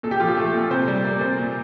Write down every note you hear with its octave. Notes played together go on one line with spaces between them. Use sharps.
A#2 A4
G4
F3 F4
G4
A3 A4
A#2
C3 C5
G3
A#3 D5
C3 C5
A#2